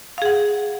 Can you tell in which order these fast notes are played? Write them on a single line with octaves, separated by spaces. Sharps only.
F5 G#4 F#5